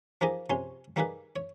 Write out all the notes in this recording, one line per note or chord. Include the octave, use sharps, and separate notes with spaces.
F3 A#3 D#4 G4 G#4 D#5
A#1 C3 C#4 G#5 C6
G3 A#3 D#4 G4 G#4 B4
C#5